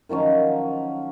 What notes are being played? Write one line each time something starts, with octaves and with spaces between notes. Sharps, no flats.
D#3 F3 F#3 C#4